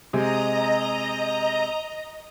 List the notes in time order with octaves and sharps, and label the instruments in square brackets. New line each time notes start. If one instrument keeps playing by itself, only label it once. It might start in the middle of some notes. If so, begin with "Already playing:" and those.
[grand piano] C3 G#3 [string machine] D#5 A#5